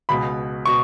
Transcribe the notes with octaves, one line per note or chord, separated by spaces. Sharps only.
C#2 B2 B5
B2 C#6